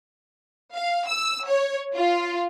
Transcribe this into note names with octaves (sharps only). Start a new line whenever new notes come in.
F5
E6
C#5
F4